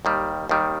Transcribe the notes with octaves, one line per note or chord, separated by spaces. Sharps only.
D#2 D#3 G3
D#2 D#3 G3